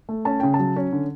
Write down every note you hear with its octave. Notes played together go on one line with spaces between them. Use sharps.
A3
C#4 A5
C#3 G5
A5
F#3
C#4
D3